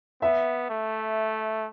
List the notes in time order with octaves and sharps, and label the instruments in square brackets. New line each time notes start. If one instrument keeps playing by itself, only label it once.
[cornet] B3 [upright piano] E5
[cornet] A3